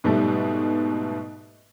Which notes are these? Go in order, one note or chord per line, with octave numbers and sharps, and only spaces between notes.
G#2 B2 G3 A3